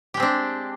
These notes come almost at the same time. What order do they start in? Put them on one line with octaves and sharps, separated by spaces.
G4 G#3 C4 D4